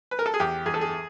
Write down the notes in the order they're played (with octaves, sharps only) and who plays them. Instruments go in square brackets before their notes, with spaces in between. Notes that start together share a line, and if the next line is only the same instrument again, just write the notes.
[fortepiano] B4
A#4
A4
G#4
E2 G4
E2 G#4
A4
G#4